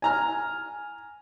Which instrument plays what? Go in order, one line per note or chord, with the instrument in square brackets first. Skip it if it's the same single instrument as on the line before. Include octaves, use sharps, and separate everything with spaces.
[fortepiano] G#5 A#5 F6